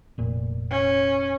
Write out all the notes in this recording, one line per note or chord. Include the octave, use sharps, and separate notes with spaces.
F1 A#2
C#4